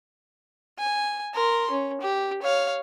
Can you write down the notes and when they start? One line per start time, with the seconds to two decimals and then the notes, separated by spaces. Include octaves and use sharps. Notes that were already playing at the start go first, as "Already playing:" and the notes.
0.79 G#5
1.34 A#4 C6
1.71 C#4
2.01 G4
2.42 C#5 F5